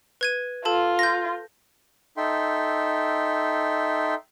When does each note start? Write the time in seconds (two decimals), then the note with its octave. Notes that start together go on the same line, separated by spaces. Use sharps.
0.21 B4 G#6 D#7
0.65 F4 A4 A5
0.99 G6 A#6
2.17 D#4 A4 E5 G5 C6